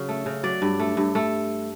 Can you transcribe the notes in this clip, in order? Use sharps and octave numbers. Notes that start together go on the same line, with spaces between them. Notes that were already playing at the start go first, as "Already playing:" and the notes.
Already playing: C#3 F#3
A3
C#3
F#3 D5
G2
A3
G2
A3